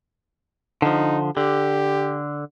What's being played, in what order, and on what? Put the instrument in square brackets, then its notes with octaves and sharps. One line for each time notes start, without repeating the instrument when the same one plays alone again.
[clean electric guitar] D3 F3 [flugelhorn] D#4
[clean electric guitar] D3 [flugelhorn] G4